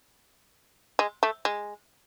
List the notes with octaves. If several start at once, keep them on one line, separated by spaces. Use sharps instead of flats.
G#3
A3
G#3